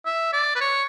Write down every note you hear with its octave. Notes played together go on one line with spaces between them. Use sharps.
E5
D5
B4
C#5